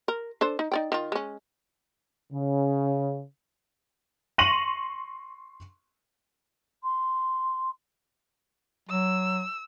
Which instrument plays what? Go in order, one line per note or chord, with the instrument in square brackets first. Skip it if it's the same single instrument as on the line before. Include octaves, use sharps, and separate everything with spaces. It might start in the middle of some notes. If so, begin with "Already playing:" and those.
[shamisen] A#4
D4 A4 C5
D#4
D#4 D5 G5
D#3 F4
G#3 C#4
[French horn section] C#3
[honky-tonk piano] C6 C#6 A#6 D#7 F7 F#7
[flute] C6
[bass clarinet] F#3 [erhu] E6